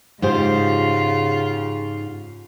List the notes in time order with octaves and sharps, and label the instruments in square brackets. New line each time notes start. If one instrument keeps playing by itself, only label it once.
[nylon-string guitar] G#2 G4 C5 [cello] C#3 F4